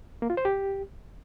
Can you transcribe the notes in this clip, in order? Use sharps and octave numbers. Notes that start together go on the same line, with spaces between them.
A#3
F4
C5
G4